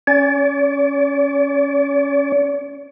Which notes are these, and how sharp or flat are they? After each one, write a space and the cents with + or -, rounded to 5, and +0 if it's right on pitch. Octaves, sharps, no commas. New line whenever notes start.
C#4 +0 D5 -45